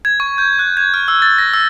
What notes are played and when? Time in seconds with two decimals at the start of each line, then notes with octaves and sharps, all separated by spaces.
0.05 G#6
0.20 C#6
0.38 G6
0.59 F#6
0.77 G#6
0.94 F6
1.08 E6
1.22 A6
1.38 A#6
1.54 E6